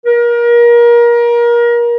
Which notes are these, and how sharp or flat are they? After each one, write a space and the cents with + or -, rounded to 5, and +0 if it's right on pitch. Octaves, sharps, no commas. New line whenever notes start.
A#4 +30